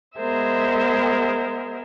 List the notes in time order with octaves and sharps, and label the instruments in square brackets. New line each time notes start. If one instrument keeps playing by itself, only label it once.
[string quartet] G#3 B3 G#4 A#4 C5 E5